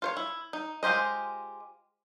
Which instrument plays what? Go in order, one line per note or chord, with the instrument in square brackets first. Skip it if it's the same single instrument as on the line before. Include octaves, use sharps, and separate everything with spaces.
[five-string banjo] F4 C5 C#5
E4
D#4
G#3 F4 G4 C5 D#5